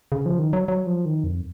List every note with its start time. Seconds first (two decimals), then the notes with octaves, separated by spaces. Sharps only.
0.12 C#3
0.26 F3
0.39 D#3
0.53 F#3
0.68 F#3
0.87 F3
1.05 D#3
1.24 F2